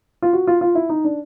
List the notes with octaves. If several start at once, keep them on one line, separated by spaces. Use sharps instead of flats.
F4
F#4
F4
F4
E4
D#4
D4